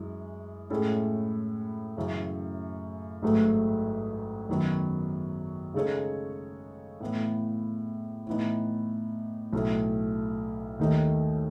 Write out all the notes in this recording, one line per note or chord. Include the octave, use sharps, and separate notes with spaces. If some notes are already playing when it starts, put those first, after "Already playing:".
Already playing: F#2 E3 G#3
A2 G#3 C#4 E4 A4
F#2 C#3 E3
A1 G#2 F#3 A3
F#2 D#3 F#3 B3 F#4
C#3 G#3 D#4 A4 C#5
A2 E3 B3
A2 E3 B3 D#4
B1 A2 E3 A3
D#2 D#3 A3 D#4